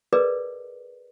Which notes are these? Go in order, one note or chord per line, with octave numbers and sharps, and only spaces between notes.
G#4 A#4 B4 D5 D#5